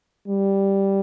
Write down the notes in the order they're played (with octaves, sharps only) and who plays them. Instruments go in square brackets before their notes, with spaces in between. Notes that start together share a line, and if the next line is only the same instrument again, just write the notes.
[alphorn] G3